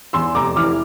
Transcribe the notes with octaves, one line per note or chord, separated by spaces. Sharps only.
E2 C6 E6
F1 A#5 D6
E3 D6 F6